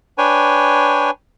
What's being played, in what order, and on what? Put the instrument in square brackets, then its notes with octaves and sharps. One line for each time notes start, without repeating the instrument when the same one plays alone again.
[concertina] D4 B4 C#5 G5 G#5